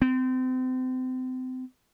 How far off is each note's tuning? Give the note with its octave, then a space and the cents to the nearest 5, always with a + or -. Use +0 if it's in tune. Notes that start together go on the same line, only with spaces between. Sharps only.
C4 -35